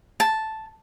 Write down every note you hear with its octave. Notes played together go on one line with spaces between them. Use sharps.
A5